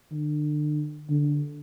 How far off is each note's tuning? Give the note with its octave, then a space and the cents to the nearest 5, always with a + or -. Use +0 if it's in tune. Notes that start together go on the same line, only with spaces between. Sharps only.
D3 +35
D3 -5